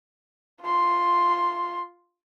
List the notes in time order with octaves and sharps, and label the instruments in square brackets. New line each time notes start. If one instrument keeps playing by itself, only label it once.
[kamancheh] F4 C6